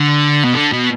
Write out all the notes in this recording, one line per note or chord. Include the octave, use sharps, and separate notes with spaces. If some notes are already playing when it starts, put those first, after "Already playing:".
Already playing: D3
B2
D3
B2